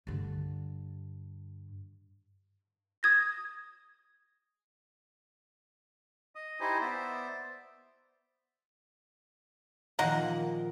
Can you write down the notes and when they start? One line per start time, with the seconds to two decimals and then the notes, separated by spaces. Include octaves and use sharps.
0.07 G2 D3
3.03 D#6 G#6 A#6
6.35 D#5 D#6
6.60 D#4 E4 G4 C5 D#5 G#5
6.81 B3 C5 D5 E5
9.99 A#2 D#3 F3 A#3 D#4 F#5